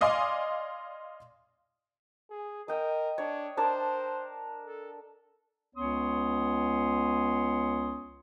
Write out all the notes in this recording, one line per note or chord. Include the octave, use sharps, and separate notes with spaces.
D5 D#5 F5 G#5 C6 D6
G#4
A#4 D#5 G5
D4 C#5
D4 A#4 C5 A5
A4
C#2 B3 C#4 C#5 C6 D#6